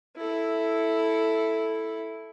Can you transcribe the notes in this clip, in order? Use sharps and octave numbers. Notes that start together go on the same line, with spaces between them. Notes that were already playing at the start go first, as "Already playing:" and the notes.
E4 A4